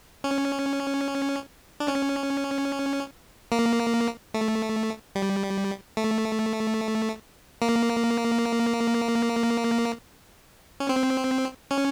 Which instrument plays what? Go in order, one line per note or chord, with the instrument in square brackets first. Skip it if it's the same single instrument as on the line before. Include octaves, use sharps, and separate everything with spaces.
[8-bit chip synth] C#4
D4
C#4
A#3
A3
G3
A3
A#3
C#4
C4
C#4